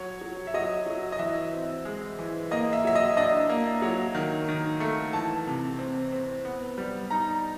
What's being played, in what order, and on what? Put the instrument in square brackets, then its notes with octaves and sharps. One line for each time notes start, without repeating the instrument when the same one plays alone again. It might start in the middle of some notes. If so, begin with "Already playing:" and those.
Already playing: [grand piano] F#3 C#5
F#3
E5
F#3 D#5
F#3
D#5
E3 E5
C4
G#3
E3
A#3 D#5
E5
F#3 E5
D#5
D4 D#5
A#3
F#3
D#3
D#3
A3
E3 A5
C3
C4
C4
B3
G3
D#4 A#5